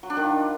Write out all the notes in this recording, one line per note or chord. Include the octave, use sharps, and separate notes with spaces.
F#3
D4
D#3
F4